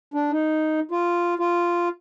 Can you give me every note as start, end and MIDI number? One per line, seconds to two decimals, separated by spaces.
0.14 0.31 62
0.31 0.80 63
0.91 1.34 65
1.39 1.88 65